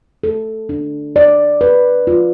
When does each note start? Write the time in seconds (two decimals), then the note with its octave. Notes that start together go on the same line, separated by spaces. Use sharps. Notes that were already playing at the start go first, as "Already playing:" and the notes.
0.24 A4
0.69 D4
1.16 D5
1.61 B4
2.07 F4